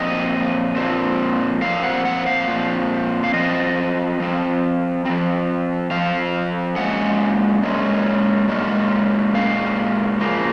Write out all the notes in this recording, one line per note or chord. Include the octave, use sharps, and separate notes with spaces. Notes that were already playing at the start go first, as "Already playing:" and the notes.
Already playing: A#2 F3 C4 D#5
A#2 F3 C4
A#2 F3 C4 F5
F#5
F#5
F5
A#2 F3 C4
F5
F3 C4 D#5
F3 C4
F3 C4
F3 C4 F5
A#2 G#3 C#4 F#5
A#2 G#3 C#4
A#2 G#3 C#4
A#2 G#3 C#4 F5
C#3 F3 A#3